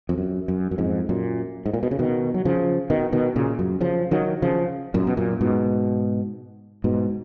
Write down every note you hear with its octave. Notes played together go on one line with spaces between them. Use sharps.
F2
F#2
F#2
F#2
F2 G#2
F#2 A#2
G#2
A#2
B2
C#3
B2 D#3
F#3
C#3 F3
B2 D#3
B2 D#3
A#2 C#3
F#2
C#3 F3
D#3 F#3
C#3 F3
F#2 A#2
B2
F#2 A#2
G#2 B2
G#2 B2